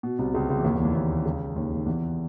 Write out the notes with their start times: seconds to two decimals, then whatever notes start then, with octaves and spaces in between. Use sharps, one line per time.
0.03 B2
0.19 C2 C3
0.34 C#2 C#3
0.49 C#2 C#3
0.59 E3
0.64 D#2 D#3
0.74 E2 E3
0.85 E2 E3
0.95 D#2 D#3
1.25 C#2 C#3
1.56 D#2 D#3
1.75 D#3
1.86 E2 E3